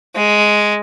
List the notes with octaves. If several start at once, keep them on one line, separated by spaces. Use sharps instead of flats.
G#3